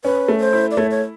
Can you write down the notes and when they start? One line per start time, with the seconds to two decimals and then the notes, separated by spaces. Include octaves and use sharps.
0.04 C#4 B4
0.28 A3
0.40 C5
0.53 E4
0.71 D5
0.77 A3 C#5
0.91 C#5